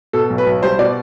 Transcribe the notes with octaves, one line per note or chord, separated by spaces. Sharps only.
B2 A4
B1
B4
B1
G3 C5
B2 D5